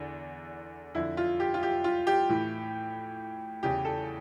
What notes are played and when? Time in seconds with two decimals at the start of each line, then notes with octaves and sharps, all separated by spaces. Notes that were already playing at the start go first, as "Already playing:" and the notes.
Already playing: E2 D3
0.95 F2 D3 E4
1.17 F4
1.40 G4
1.54 F4
1.63 G4
1.84 F4
2.07 G4
2.29 A2 E3
3.63 E2 C#3 E3 G4
3.85 A4